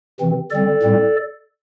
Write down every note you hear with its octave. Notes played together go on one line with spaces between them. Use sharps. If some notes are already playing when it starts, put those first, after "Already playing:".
C3 E3 C4
D3 G3 C4 A4 D5
A2 G3 C4